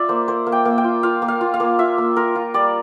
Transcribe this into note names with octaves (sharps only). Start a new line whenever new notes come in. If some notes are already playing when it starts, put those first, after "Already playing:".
Already playing: F4 D5 E5
A#3 C5
A#3 C5
A#3
G5
A#3
G5
F4
F4 F5
A#3
F5
F4
F5
A#3
F4 E5
A#3
F4 A#4
F4
G3 D5